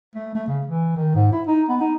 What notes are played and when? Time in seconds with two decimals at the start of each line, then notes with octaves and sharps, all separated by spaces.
0.15 A3
0.35 A3
0.48 C#3
0.67 E3
0.96 D#3
1.15 G#2
1.33 E4
1.48 D#4
1.69 B3
1.81 D#4